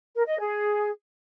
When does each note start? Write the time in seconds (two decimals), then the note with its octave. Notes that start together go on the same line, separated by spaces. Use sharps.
0.15 A#4
0.27 D#5
0.39 G#4